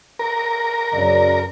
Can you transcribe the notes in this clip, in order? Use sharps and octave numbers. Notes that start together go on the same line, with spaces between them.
A#4
F#2 C#3 D5